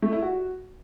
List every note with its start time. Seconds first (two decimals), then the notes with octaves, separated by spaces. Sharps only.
0.02 A3
0.12 E4
0.22 F#4